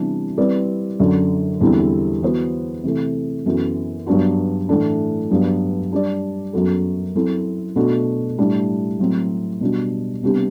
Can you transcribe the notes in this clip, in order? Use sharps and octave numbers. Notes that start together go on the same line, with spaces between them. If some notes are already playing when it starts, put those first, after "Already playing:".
Already playing: C3 E3 G3 B3 D4
G3 C4 E4 B4 D5
F#2 D3 F#3
E2 D3 G3 C4 E4
E3 B3 F#4 C5
C3 E3 A3
F#2 E3 B3 F#4 A4
G2 F#3 B3 D4 F#4
A2 E3 A3 D4
G2 F#3 B3 D4
G3 D4 G4 D5
F#2 F#3 B3 F#4 A4
F#3 C4 E4 A4
B2 A3 D4 F#4
A2 G3 D4
A2 F#3 C4
B2 G3 D4 F#4
C3 G3 B3 D4 G4